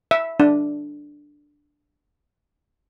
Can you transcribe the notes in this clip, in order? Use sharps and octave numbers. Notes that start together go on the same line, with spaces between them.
E5
D4